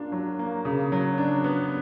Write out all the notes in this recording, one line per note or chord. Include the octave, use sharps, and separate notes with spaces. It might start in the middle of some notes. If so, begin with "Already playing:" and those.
Already playing: A#3 D4 F4
F#3
A#3
C#3
F#3
D4
B3